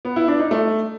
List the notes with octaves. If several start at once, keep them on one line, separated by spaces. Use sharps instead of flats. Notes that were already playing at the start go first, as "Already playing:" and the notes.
B3
E4
D4
D#4
A3